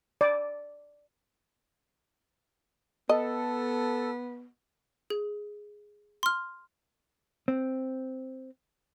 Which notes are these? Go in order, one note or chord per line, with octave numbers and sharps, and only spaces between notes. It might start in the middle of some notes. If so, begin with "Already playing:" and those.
D5
B3 A4 D#5
G#4
C6 F6
C4